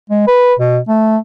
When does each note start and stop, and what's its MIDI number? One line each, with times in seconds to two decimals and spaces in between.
0.10 0.22 56
0.27 0.54 71
0.59 0.78 47
0.88 1.17 57